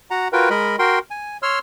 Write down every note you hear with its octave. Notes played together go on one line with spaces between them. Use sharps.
F#4 F#5 A#5
F4 F#4 A#4 B4 G5
G#3 A#4 D#5 B5
F#4 A#4 G5 C6
G#5
C#5 C6 E6 F6